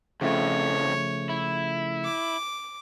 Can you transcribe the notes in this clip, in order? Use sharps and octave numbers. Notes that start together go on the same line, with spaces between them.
F2 A2 C#3 F3 A3 C#5
E4
D6